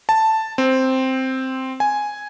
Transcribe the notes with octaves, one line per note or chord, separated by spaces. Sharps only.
A5
C4
G#5